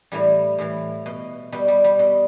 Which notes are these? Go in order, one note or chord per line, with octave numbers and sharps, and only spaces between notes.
A2 E3 G3
A2 E3
B2
B2 G3
G3
G3
B2